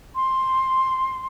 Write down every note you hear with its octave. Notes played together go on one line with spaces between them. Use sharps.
C6